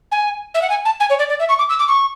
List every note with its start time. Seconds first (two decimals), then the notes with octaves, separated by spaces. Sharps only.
0.11 G#5
0.54 E5
0.62 F#5
0.70 G#5
0.85 A5
1.00 G#5
1.09 C#5
1.19 D5
1.29 D5
1.39 E5
1.49 C#6
1.58 D6
1.69 E6
1.79 D6
1.88 C#6